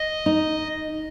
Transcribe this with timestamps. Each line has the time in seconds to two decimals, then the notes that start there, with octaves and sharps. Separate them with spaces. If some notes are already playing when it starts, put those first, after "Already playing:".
Already playing: D#5
0.26 D#4